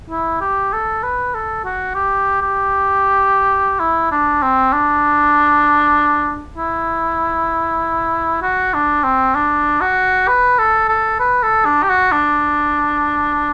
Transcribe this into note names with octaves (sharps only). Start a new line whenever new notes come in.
E4
G4
A4
B4
A4
F#4
G4
G4
E4
D4
C4
D4
E4
F#4
D4
C4
D4
F#4
B4
A4
A4
B4
A4
D4
G4
F#4
D4